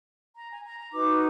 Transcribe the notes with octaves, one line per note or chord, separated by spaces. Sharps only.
A#5
G#5
A#5
A#5
D#4 F#4 B4 D6